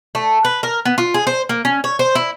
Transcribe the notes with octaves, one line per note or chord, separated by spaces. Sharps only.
A3
B4
A#4
B3
F4
G#4
C5
A#3
C#4
C#5
C5
E4